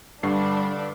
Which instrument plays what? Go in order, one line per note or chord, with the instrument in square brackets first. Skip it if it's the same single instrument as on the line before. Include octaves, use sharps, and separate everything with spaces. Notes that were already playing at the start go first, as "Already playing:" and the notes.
[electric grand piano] G2 [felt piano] D3 C#6 C7 [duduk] G3 [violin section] D4